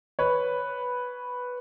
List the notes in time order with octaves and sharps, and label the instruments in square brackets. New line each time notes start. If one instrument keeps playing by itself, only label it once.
[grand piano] B4 C#5